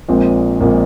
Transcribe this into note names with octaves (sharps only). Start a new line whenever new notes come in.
A#1 A#2 G#3 C4
A#1 A#2 G#3 C4